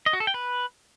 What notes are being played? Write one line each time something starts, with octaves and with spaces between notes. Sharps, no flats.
D#5
F#4
A4
G5
B4